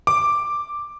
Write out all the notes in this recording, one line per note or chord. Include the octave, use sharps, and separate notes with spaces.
D6